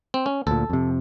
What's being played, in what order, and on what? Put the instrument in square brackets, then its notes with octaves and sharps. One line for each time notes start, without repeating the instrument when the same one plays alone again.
[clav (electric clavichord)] C4
C#4
[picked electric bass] D2 A#2 [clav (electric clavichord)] A4
[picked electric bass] F2 C3